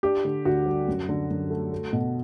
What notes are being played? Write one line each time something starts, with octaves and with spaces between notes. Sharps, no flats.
D4 G4
D3
D2 F#4
G3
F#2
D3
F#2
A3
A3
B2